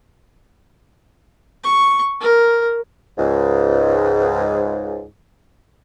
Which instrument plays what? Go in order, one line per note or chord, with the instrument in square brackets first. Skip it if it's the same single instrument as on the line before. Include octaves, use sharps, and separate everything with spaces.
[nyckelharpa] C#6
A#4
[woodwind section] C#2 G#2